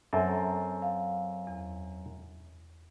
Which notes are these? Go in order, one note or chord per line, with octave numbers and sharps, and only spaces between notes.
F#2 C4 A4 E5 A5
F5
E2